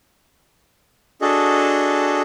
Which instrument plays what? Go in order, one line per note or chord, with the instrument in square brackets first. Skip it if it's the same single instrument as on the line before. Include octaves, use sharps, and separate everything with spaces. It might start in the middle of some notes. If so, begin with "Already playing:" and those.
[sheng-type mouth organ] D4 F#4 G#4 A4 D#5